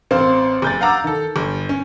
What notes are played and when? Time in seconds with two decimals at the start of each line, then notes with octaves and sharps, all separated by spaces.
0.11 A1 C4 C5 F5
0.62 F#1 G6 A6
0.81 F5 F#5 A#5 D6 E6
1.04 D#3 A4
1.36 G1
1.69 C#4